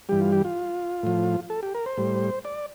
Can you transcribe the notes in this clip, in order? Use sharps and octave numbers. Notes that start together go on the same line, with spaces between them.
G2 E3 G3 G4
F4
G4
F4
A2 F3
A4
G4
A#4
C5
A2 G3
D5